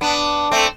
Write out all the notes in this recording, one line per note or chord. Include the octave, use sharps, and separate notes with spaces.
B3 D4
A3 C4